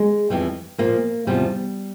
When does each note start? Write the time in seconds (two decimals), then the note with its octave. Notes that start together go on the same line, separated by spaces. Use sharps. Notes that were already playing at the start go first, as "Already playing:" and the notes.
Already playing: G#3
0.30 F2 E3 G3
0.78 A#2 F3 A#3
1.27 E2 C3 F3 G3